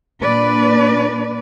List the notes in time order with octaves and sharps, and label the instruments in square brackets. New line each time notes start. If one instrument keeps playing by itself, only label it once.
[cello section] A#2 A#3 D4 B4 D5